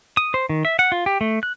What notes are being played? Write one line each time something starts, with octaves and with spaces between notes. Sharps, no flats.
D#6
C5
D#3
E5
F#5
F4
G4
A3
F#6